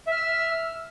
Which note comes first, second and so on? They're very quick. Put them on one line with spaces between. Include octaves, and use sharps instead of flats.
E5 F6 E6